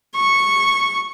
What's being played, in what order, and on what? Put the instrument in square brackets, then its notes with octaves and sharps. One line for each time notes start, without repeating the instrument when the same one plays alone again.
[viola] C#6